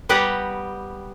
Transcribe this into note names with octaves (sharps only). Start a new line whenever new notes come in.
G3 B3 G4 B4 F#5 A#5